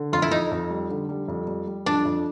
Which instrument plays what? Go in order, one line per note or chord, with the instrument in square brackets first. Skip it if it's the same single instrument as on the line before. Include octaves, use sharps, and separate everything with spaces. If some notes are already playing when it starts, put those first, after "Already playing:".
Already playing: [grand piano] D3
[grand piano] F2 [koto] F4
[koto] E4
[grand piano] F2 [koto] D#4
[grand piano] F2
G3
D3
G3
F2
G3
G3
[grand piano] F2 [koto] D4
[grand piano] F2